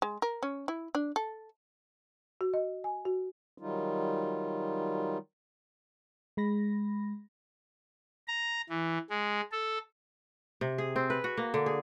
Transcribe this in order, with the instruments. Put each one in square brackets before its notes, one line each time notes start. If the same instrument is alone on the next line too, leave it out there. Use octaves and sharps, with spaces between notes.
[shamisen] G#3
A#4
C#4
E4
D4
A4
[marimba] F#4
D#5
G#5
F#4
[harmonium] D#3 F#3 G3 D#4 F4
[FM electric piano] G#3 B5 A#6
[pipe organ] A#5
E3
G#3
A4
[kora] C3
G#4
C4
B4
F#4
A#3
D3
G#4